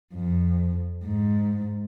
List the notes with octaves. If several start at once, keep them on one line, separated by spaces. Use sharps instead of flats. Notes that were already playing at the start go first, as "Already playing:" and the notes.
F2
G#2